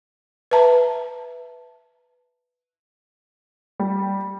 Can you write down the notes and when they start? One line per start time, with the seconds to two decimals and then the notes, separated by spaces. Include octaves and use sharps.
0.51 B4 E5 A5 A#5
3.79 G3